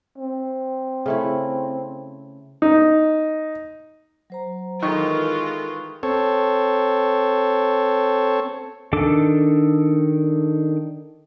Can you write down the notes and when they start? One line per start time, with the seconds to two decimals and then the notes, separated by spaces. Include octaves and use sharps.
0.18 C4
1.06 C#3 A3 E4
2.62 D#4
4.30 F#3 C5 A#5
4.83 D#3 E3 G#3 F4 A4 A#4 C#6
6.03 C4 A4 C#5
8.93 D#3 D4 A4 D6